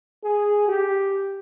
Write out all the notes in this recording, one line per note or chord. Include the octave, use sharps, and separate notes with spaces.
G#4
G4